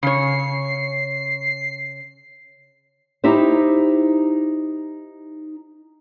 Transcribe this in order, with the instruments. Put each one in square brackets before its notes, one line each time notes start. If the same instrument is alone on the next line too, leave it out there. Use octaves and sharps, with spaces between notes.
[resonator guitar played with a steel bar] C#3 C#5 [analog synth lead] C7
[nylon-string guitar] D#4 E4 G4 C5